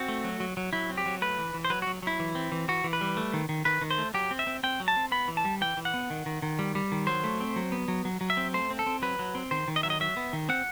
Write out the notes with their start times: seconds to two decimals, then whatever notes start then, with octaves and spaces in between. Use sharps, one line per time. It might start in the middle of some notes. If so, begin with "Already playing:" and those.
Already playing: C4 F#4
0.08 A3
0.24 F#3
0.40 F#3
0.57 F#3
0.73 F#3 E4
0.90 C4
0.97 G4
1.06 F#3
1.22 A3 B4
1.39 E3
1.54 E3
1.65 C5
1.70 F#3 B4
1.82 F#4
1.87 F#3
2.02 F#3 E4
2.20 E3
2.35 C4
2.52 E3
2.68 E3 F#4
2.84 E3
2.93 B4
3.01 G3
3.17 A3
3.34 D#3
3.49 D#3
3.65 D#3 B4
3.81 D#3
3.91 C5
3.98 A3
4.14 F#3 G4
4.31 C4
4.39 E5
4.47 C4
4.63 C4 G5
4.80 F#3
4.88 A5
4.97 C4
5.12 B3 B5
5.28 E3
5.37 A5
5.45 G3
5.61 E3 G5
5.77 E3
5.85 F#5
5.94 B3
6.10 D#3
6.26 D#3
6.42 D#3
6.59 G3
6.75 G3
6.92 D#3
7.07 F#3 C5
7.24 A3
7.41 C4
7.56 F#3
7.72 B3
7.88 F#3
8.05 F#3
8.21 F#3
8.30 E5
8.37 C4
8.54 A3 C5
8.71 C4
8.79 A4
8.86 C4
9.02 F#3 B4
9.19 F#3
9.35 C4
9.51 D#3 C5
9.68 D#3
9.76 D#5
9.83 F#3 E5
9.90 D#5
10.00 F#3 E5
10.17 B3
10.33 D#3
10.49 C4 F#5